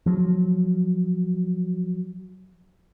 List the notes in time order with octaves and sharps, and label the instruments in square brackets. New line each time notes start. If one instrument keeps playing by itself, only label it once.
[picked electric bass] F3 F#3